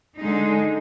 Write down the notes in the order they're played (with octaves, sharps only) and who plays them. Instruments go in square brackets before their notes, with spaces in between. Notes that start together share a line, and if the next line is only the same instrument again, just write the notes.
[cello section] D3 G#3 D#4